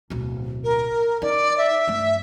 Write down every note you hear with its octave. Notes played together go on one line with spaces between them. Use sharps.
D1 B1
A#4
D#4 D5
E5
G2 A3